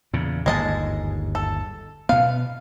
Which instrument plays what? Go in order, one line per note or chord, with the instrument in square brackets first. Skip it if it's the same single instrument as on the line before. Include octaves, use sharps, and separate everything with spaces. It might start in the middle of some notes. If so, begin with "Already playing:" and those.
[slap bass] E2 A#2 C#3
[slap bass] G1 D#2 G#2 [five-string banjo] G#3 D#5 A5
[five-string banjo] A4
[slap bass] B2 B3 [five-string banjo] F5